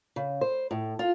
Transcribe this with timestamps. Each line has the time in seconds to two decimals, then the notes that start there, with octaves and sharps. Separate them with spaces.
0.16 C#3
0.41 C5
0.71 A2
0.99 F4